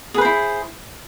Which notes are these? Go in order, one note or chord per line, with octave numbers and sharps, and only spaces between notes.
E4 G#4 B4 C5